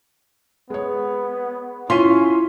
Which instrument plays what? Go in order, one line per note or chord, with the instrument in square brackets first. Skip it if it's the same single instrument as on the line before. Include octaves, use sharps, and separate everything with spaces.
[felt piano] G#3 C#5 [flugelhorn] B3
[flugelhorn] C#4 [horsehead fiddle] E4 [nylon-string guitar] F4 [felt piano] C6 B6 D#7